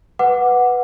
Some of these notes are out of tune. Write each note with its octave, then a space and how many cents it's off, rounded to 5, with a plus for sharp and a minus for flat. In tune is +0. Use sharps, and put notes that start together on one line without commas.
B4 +0 F#5 -5 D6 +0